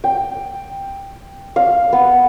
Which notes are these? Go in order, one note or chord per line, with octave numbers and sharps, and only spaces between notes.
G5
F5
B3